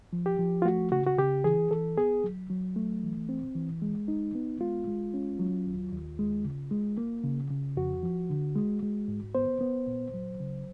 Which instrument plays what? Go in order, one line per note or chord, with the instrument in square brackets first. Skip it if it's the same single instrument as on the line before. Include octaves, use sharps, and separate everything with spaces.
[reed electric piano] F3
G4
F3
F4
A3 F#4
C#3 F#4
F#4
C#3 G4
E3 G#4
E3 A4
B3 G#4
F#3
F#3
A3
E3
C4
E3
G#3
D#4
B3
G#3 F4
G#3
C#4
F#3
D#2
D#2
G#3
C#3
G#3
A#3
C#3
C#3
F2 F#4
F3
D3
G#3
G#3
G#2
B3 C5
B3
A#2
F#3
C#3